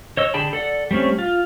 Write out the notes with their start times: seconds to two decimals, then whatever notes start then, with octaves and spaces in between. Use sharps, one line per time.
0.17 C#5 D#5 E6
0.34 D3 G#4 G5 A5 B5
0.53 A4 D5 F#5
0.91 G3 A3 C4 C#4
1.19 F4